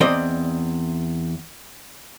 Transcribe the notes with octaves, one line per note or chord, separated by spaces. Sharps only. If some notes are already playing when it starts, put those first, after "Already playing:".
E2 C4 D5 D#5